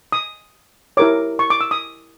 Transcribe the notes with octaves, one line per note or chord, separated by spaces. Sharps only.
D#6
E4 G4 A#4 C#5 D6
C#6
D6
E6
D#6